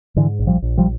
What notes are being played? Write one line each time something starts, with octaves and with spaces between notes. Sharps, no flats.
G#2 D3 E3
A#1
F3 G3
A#1
F3 G3